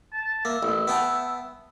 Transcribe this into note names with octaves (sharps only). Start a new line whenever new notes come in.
A5
A#3 E5
A1
B3 G5 A5